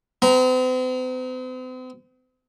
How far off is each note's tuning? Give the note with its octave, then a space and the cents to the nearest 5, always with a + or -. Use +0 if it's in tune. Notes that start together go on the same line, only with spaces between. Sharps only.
C4 -45 A#5 +5